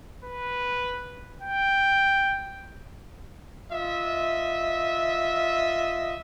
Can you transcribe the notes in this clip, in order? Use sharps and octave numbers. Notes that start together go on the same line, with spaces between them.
B4
G5
F4 D#5 E5